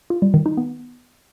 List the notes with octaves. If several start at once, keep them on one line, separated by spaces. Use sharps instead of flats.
F4
G3
D#3
D#4
B3